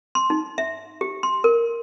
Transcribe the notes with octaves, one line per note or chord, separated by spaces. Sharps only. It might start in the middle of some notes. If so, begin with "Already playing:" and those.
C6
D#4
E5
G4
C6
A#4